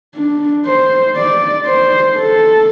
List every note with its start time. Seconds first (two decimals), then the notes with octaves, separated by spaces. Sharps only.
0.15 D4
0.66 C5
1.16 D5
1.65 C5
2.15 A4